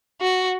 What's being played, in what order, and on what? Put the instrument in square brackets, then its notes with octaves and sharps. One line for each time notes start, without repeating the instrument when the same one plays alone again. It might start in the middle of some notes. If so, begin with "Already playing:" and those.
[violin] F#4